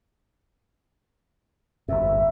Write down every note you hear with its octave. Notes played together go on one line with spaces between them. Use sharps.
G1 F2 E5